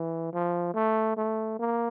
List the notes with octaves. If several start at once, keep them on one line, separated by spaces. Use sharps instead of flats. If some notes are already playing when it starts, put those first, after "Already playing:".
Already playing: E3
F3
A3
A3
A#3